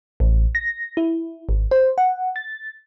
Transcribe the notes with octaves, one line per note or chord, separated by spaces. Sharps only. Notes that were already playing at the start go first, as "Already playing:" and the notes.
A1
A#6
E4
G#1
C5
F#5
A6